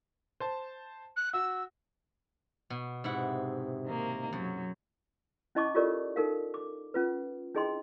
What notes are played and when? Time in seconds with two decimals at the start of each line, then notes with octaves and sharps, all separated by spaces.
0.40 C5 A5
1.17 F#6
1.33 F#4 E6
2.70 B2
3.04 G#2 C3 E4 F#5
3.86 D#3 A#3
4.33 F#2 F#3
5.55 C#4 E4 D#5 A5 C#6 D6
5.75 F4 G4 A4 A#4 C#5 D5
6.16 D#4 A4 A#4 F5
6.54 D6
6.94 C#4 F4 B4
7.55 D4 E4 G#4 D#5 G5 C6